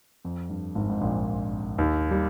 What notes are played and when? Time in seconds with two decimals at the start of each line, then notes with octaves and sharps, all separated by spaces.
0.25 F2
0.50 G2
0.75 G#1 G#2
0.90 G#2
1.01 A#1 A#2
1.78 D#2 D#3
2.11 G3